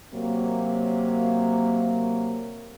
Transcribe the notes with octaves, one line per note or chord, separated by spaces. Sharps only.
C3 F#3 A#3